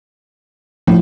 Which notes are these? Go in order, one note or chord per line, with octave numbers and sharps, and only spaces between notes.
A2 F3